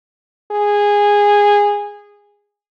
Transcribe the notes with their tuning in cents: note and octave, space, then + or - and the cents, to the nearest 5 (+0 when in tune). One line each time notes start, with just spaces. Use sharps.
G#4 -15